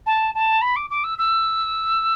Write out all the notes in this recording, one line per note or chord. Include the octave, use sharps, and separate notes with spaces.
A5
A5
B5
D6
D6
E6
E6